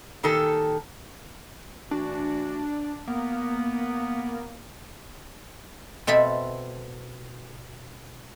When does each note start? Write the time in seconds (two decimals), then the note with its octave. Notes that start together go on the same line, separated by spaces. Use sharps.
0.23 A#2 D#3 G4 A4
1.91 E3 A3 D4 F#4
3.07 A#3 B3
6.07 B2 C4 A4 E5 B5